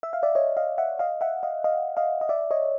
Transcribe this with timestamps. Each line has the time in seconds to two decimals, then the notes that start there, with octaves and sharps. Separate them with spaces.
0.03 E5
0.13 F5
0.23 D5 E5
0.35 C#5 D#5
0.57 D#5 F5
0.78 E5 F#5
0.99 D#5 F5
1.21 E5 F#5
1.43 D#5 F5
1.64 D#5 F5
1.97 D#5 F5
2.21 D#5
2.29 D5 E5
2.51 C#5 D#5